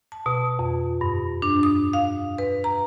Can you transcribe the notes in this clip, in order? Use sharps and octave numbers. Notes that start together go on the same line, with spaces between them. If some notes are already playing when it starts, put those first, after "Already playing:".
A5
B2
F2
G2
D4
D#6
F5
B4
A#5